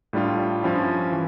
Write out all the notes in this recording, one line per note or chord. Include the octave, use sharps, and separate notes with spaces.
A2 G3 D4 F4
G2 F3 C#4 E4
E3